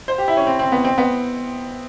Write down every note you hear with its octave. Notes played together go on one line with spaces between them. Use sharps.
C5
G4
E4
C#4
C4
C4
B3
C4
B3